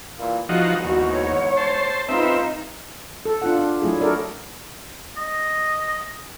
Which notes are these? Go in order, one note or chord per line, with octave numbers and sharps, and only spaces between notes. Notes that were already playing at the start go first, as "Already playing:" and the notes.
A#2 E3 A#3
E2 G#2 F3 D#4 F#4
D#2 F#4
C#5
C5 A5
C4 D#4 F4 G#4 B4 E5
A4
D4 F4 F#5
D4
F#3 A3 E4 G#4
D4 F#4 A4 A#4 D5
D#5